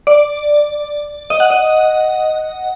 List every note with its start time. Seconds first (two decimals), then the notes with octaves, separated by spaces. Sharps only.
0.07 D5
1.30 D#5
1.40 F#5
1.50 D#5